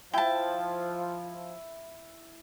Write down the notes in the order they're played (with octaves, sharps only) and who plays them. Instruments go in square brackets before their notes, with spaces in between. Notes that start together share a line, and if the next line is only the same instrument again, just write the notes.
[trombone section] F3 [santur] E4 [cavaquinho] G5 A5